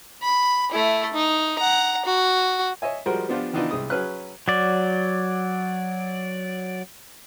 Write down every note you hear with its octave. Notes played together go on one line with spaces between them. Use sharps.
B5
A3 E4
D#4
F#5 A#5
F#4
C#5 D#5 E5 G#5
F3 G3 G#3 F#4 A#4 C5
F3 B3 D4 F4 G4
D#3 E3 B3 D4 D#4 F4
C2 G#3 D#6
F#3 C#4 G#4 B4 F6 F#6
F#3 D5